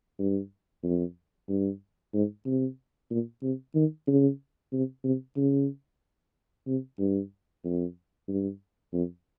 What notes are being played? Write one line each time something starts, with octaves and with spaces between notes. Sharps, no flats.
G2
F2
G2
G#2
C3
A#2
C3
D#3
C#3
C3
C3
C#3
C3
G2
F2
G2
F2